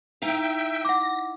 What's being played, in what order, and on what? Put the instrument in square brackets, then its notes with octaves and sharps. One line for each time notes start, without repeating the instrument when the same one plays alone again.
[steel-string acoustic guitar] D#4 E4 F5 [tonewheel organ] E5 G5
[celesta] F#5 D6 [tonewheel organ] A#6